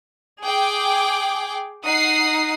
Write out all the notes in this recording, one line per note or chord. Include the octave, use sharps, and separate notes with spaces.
G#4 G5 D6
D#4 F#5 D#6 C7